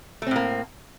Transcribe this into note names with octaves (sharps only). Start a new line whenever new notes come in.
A2 A3 A#3 C4